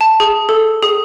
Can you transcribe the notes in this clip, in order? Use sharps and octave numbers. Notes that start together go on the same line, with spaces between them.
A5
G#4
A4
G#4